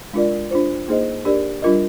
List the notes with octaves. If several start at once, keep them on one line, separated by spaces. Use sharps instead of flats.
G#3 D4 F4 A#4 D5
D4 F4 C5
A#3 D#4 G#4 C5 D#5
D4 G4 A#4 D5
G3 D4 F4 A#4 D#5